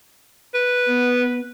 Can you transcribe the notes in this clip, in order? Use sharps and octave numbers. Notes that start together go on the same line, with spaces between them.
B4
B3